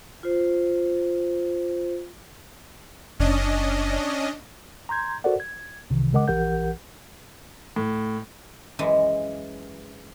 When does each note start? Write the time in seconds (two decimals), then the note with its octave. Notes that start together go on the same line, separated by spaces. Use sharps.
0.23 F4 C5
3.19 F#1 C#4 D4 D#5
4.89 A#5 C6 G6 G#6
5.24 F#4 A4 A#4 C5 D5 F#5
5.40 G#6
5.90 C2 C3 D#3 E3
6.13 C#3 G#3 A#4 D#5 F#5 D6
6.28 A#1 E3 G4 A#4 F#5 G6
7.76 A2
8.79 F#2 E3 G#3